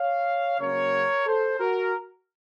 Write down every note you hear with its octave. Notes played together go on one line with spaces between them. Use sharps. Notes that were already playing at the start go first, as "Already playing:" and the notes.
Already playing: C#5 F5
C#3 F#3 A#3 C#4 A#4 C#5
A4 C5
F#4 A#4